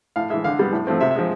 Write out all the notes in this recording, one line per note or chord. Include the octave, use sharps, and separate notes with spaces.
A2 F5
E3 G#3 E5
D3 F5
G3 B3
A2
F3 A3 C4
C3 E5
E5
F3 G#3